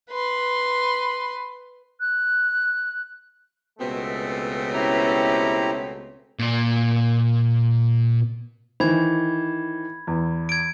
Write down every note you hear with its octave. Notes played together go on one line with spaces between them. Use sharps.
B4 C6
F#6
C#2 B2 A3 B3 C4
C#4 E4 G4 A#5
A#2 D5
D#3 E3 C5 B5 G#6
E2
G#6 D7